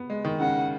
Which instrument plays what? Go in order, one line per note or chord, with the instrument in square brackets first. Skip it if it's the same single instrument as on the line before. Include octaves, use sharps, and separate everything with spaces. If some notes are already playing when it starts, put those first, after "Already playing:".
Already playing: [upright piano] B3
G#3
D#3
[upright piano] C#3 [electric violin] F#5